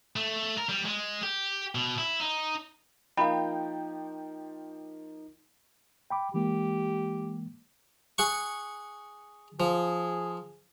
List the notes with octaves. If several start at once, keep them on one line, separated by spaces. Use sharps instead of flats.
A3
A#4
G3
G#3
G4
B2
E4
D#4
F3 A#3 D#4 F5 G5 B5
G5 B5 D6
E3 G#3 A#3 G4
G#4 F#5 C#6
F3 G#4